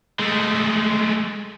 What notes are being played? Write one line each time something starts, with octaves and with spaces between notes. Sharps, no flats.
G#3 A3